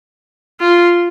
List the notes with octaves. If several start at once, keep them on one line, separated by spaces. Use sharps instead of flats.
F4